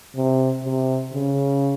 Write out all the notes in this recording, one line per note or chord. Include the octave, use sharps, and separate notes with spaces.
C3
C3
C#3